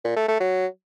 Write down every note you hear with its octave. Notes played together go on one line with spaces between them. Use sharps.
A#2
A3
A3
F#3